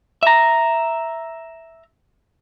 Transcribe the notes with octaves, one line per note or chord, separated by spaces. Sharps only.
E5 A#5